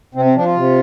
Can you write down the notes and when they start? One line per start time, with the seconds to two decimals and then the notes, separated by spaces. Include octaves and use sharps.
0.15 C3 C4
0.25 C4
0.35 F3 D4
0.45 F4
0.56 C3